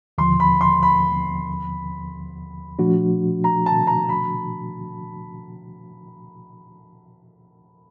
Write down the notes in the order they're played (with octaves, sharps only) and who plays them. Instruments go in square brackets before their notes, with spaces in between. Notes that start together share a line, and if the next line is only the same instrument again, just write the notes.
[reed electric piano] D#2 D3 F3 [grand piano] C6
[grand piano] B5
C6
B5
[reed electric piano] A#2 F3 A3 D4 F#4
[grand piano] A#5
A5
A#5
B5